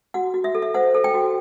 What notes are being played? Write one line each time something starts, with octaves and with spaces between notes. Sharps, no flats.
F#4 F#5
F#4
E5
A4
E5
C5 F#5
A4
G5
F#4